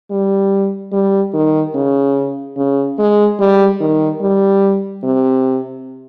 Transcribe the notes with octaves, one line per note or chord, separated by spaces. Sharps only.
G3
G3
D#3
C#3
C#3
G#3
G3
D#3
G3
C3